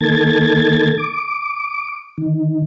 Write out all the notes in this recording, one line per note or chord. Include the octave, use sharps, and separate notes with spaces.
D#3 A#3 A4 G#6 A6
D6
D#3